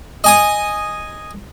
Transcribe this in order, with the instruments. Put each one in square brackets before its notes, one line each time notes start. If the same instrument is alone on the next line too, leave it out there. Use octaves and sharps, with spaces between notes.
[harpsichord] D#5 G#5 D#6